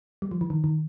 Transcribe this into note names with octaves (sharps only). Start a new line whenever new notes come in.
G3
F3
E3
D#3
D#3